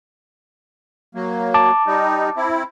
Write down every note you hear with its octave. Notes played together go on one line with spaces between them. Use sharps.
F#3 A#3
A5 D6
G3 D#4
C4 E4